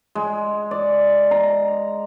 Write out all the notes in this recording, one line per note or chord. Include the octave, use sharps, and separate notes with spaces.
G#3
D5
A#5